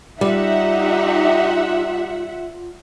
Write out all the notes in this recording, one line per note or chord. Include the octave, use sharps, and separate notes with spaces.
G3 D#4 F4 G4 E5 F#5